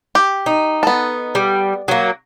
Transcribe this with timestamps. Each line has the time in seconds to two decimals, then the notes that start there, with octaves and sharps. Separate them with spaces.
0.15 G4
0.46 D#4
0.83 B3 A4
1.35 G3
1.88 F#3 A#3